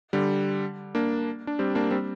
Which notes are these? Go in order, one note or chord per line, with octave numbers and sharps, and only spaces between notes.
D3 G3
A#3 D4
D4
G3 C4
A#3 D4
G3 C4